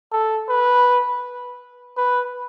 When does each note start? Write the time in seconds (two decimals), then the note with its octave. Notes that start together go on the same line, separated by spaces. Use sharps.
0.12 A4
0.49 B4
1.97 B4